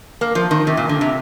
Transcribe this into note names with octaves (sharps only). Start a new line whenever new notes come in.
A#3
F3
D#3
C3
A#2
D3
C3